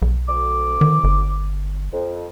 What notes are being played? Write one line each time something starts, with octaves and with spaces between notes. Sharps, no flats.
B1
D2 D6
D#3
G1
F2